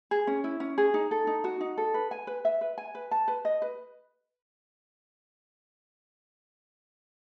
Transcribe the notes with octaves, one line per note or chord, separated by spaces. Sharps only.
G#4
C#4
E4
C#4
G#4
D#4
A4
D#4
F#4
D#4
A4
B4
G#5
B4
E5
B4
G#5
B4
A5
B4
D#5
B4